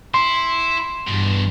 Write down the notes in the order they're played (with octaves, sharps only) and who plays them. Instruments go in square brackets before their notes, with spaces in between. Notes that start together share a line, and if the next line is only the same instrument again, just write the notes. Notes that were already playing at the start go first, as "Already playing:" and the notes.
[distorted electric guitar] E4 [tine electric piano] C6
[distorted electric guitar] E2 B2 [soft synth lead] G2